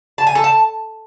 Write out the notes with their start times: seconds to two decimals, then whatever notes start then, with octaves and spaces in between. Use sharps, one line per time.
0.18 A5
0.27 G#5
0.35 A4
0.44 A5